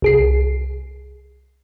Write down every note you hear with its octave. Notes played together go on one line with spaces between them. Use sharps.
C2 G#4 C7